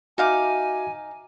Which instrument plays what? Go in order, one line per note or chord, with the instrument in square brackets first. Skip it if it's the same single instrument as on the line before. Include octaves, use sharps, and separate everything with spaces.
[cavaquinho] D#4 F5 D6 [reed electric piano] F#4 E5 [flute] G#5